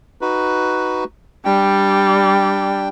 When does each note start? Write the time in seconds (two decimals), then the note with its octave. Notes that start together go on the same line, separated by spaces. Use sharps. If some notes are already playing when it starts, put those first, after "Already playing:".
0.21 D#4 F#4 B4
1.45 G3 D4 G5